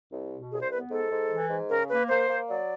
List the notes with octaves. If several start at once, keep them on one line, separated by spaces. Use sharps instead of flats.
C2
B2
C2 G#4
C5
B3 B4
G#2 A4
G#2
E3
G#2
C#3 A#4
A#3 B4
A#3 C5
A#3
F#3 D5